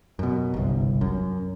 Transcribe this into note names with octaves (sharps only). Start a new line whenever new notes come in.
F#2 B2
G1 C2
F#2